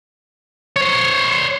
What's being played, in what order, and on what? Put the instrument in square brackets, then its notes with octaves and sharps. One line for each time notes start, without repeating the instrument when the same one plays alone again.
[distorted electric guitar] C5 C#5